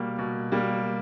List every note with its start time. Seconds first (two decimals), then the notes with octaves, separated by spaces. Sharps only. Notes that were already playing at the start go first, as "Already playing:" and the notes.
Already playing: B2 G3 A#3
0.19 B2
0.52 G3 A#3